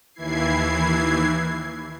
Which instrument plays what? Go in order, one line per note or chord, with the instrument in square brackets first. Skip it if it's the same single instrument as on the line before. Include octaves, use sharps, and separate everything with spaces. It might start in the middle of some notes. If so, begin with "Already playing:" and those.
[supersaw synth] D#2 E3 E4 G#6 C7